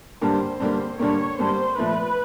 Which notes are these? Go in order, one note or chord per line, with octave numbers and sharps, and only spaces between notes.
G2 D3 G3 A#3 C5
G2 D3 G3 A#3
G2 D3 G3 A#3 C#5
G2 D3 G3 A#3 C5
A#2 F3 A3 B4